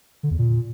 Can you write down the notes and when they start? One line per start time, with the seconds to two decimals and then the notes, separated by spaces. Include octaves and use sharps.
0.23 D3
0.31 E2
0.39 A#2